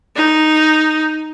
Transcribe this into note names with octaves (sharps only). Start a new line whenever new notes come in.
D#4